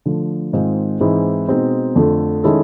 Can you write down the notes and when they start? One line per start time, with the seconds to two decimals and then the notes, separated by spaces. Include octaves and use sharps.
0.05 D3 F3 A3
0.53 G#2 D#3 G#3 C4 F4
1.01 G#2 E3 G#3 C4 E4
1.49 B2 G#3 C4 D#4
1.96 F2 D3 F3 A3
2.44 D#3 G#3 C#4 E4 A4